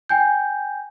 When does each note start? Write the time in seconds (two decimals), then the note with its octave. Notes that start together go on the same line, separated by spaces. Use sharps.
0.09 G5 G#5 G6